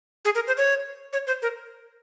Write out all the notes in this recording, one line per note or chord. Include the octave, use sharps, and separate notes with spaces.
G#4
A#4
C5
C#5
C#5
C5
A#4